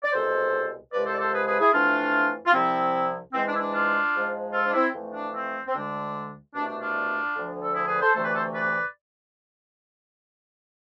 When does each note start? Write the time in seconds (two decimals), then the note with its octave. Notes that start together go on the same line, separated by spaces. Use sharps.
0.04 D5
0.12 C2 B2 G#3 A4 C5
0.93 C2 C3 F3 G#3 B4 D5
1.06 A4 C5
1.14 D5
1.19 A4 C5
1.33 G#4 B4
1.47 G#4 B4
1.60 E4 G#4
1.73 F2 E3 A3 D4 F4
2.46 F4
2.53 C2 C3 F3 C4 E4
3.33 G#2 E3 G#3 C4
3.47 D4
3.55 E4
3.60 D4
3.74 D4 F4
4.14 G#2 F3 G#3
4.53 F4 A4
4.66 D4
4.74 C4 E4
4.94 F2 E3 A3
5.14 D4
5.34 C4
5.67 C4
5.74 D2 D3 G#3 D4
6.54 C2 B2 A3 D4
6.68 D4
6.81 D4 F4
7.35 D2 D3 F3
7.63 A4
7.75 E4 G#4
7.88 G#4 B4
8.01 A4 C5
8.15 D2 C3 E3 A3 A4 C5
8.24 B4 D5
8.35 A4 C5
8.54 B4 D5